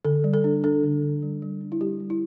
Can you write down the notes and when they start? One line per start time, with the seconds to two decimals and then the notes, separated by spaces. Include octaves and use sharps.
0.05 D3 A4
0.24 G3
0.34 A4
0.44 D4
0.64 D4 A4
0.83 D3
1.02 D3
1.22 G3
1.42 G3
1.61 D4
1.72 E4
1.81 G3 G4
2.00 G3
2.10 E4